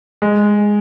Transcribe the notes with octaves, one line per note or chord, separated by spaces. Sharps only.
G#3